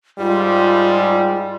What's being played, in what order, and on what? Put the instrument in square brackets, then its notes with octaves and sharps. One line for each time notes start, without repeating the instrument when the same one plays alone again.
[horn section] G#2 G3 [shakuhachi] F4